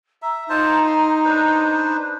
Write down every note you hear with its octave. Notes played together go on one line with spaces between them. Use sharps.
E5 A#5
D#4 F4 C5 A5
C6
D4 B4 C5